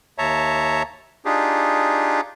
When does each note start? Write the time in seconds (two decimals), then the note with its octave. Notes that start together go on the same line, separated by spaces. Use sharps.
0.18 D#2 C#5 E5 A5 A#5
1.25 D4 D#4 F4 G4 G#4